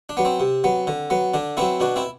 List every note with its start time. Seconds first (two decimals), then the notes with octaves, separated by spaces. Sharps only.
0.09 D4
0.17 F#3 B3
0.25 C4
0.40 C3
0.64 F#3 B3
0.87 D3
1.10 F#3 B3
1.34 D3 D4
1.57 F#3 B3 C4 E4
1.80 B2 D4 F#4
1.96 C4 E4